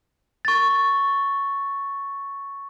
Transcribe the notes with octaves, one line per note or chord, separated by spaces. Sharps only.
C#6 A6